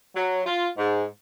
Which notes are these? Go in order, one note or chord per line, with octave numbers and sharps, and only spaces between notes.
F#3
F4
G#2